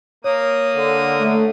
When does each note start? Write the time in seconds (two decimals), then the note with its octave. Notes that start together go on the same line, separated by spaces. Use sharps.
0.24 A#3 C#5 D#6
0.74 D3
1.20 A3